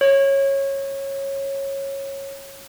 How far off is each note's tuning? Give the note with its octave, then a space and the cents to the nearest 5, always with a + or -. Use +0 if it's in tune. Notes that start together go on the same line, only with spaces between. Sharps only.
C#5 -15